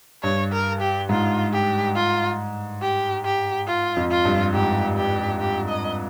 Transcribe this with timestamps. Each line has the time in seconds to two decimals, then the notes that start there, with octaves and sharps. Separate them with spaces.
0.23 G2 C#5
0.52 A#4
0.81 G4
1.09 G#2 F4
1.52 G4
1.95 F4
2.82 G4
3.25 G4
3.67 F4
3.97 F2
4.10 F4
4.25 G2
4.53 G#2 G4
4.97 G4
5.40 G4
5.69 D#5